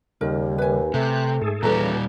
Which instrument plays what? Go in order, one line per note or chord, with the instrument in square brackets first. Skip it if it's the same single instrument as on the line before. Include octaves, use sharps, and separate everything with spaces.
[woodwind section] D#2 [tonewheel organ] C#3 G3 [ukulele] A#4
[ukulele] B4 G#5
[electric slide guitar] C3 [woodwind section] A3 [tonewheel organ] F#6
[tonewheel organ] G#2 G#4 A4
[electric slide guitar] A#2 G3 [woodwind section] C#3 A#5 [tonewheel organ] E3 [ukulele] F#4 A4 B4